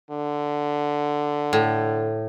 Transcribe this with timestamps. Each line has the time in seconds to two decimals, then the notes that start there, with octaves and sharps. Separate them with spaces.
0.11 D3
1.53 A2